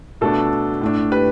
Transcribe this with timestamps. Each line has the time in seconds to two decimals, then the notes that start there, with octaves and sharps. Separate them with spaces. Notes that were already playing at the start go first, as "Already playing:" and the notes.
0.21 B2 A3 D4 A4
0.81 A2 A3 D4
1.11 G4 B4